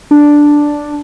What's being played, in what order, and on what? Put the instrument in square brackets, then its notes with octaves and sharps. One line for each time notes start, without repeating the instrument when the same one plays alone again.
[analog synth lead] D4